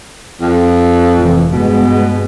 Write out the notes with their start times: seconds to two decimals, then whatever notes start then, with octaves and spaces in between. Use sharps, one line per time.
0.41 F2
1.18 F1 A#2 E3
1.52 G2 B2 G#3 B3